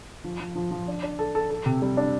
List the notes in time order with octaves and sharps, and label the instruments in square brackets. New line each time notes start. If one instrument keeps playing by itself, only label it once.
[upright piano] F3
F3
F3
F3
D4
D4
A4
A4
A4
C3
G3
D4